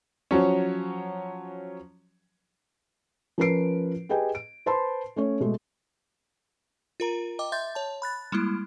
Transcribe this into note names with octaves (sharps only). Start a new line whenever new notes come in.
F3 F#3 C#4
F3 C#4 A#4 B4 C7 D7
G4 G#4 B4 D#5 G5 G#5
D7
B4 C5 A5 B5 C6
A3 C#4 C#5
B2 G#3 A3
F4 A#4 A#5
D#5 G5 D6
E5 C6 G6 A6
C#5 A5
B5 F#6 A6
G3 G#3 A#3 E4